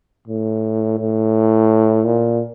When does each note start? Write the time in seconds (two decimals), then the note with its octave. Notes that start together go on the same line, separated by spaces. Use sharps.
0.28 A2
0.99 A2
2.05 A#2